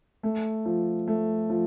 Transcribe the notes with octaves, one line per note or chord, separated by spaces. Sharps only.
A3
F3
A3
F3